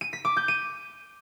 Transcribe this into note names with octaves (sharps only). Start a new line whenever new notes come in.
D#7
B6
D6
G6
D#7